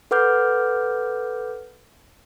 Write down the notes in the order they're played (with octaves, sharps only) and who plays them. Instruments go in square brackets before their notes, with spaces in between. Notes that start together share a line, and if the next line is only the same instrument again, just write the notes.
[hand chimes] A4 B4 F#5 D6 F6 G6